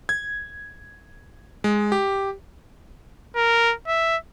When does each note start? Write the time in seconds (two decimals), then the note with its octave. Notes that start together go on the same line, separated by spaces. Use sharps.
0.09 G#6
1.64 G#3
1.92 G4
3.36 A#4
3.88 E5